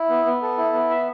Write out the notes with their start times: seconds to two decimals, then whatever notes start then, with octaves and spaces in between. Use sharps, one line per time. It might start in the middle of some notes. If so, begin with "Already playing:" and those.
Already playing: E4
0.09 B3
0.25 B3
0.42 A4
0.58 E4
0.73 B3
0.90 E5